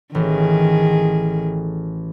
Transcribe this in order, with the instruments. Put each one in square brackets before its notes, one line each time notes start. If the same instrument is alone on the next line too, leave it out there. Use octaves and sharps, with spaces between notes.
[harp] A1 [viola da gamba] D#3 G#4